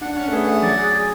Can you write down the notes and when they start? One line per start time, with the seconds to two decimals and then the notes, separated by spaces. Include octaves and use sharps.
0.01 D4 F#5
0.16 C#4 F#5
0.28 A3
0.32 B3 G#4
0.47 A3 F#5
0.62 F#3 D5
0.78 G#4
0.93 G#4